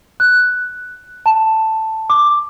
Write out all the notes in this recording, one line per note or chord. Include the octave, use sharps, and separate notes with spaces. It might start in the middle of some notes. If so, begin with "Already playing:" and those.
F#6
A5
D6